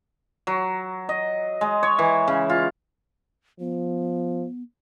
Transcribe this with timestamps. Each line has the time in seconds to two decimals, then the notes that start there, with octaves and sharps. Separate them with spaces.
0.47 F#3
1.09 D#5
1.61 G#3
1.83 C#5
1.99 E3
2.28 C#3
2.50 F4
3.60 F3 B3